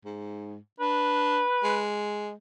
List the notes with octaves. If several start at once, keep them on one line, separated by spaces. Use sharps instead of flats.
G#2
D4 B4
G#3